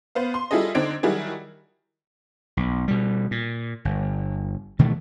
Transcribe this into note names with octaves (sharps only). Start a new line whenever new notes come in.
B3 C5 F5
C6
G3 E4 F4 G#4 A4 D#5
D3 C4 D4 D#4 G#6 D7
D#3 F#3 G3 E4 F#4 G#4
B1
B2 G3
A#2
G1
B2 D#3 E3 A3